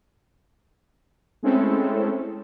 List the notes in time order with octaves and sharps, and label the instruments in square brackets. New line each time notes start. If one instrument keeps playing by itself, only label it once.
[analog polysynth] G#3 A3 C4 C#4 E4 A4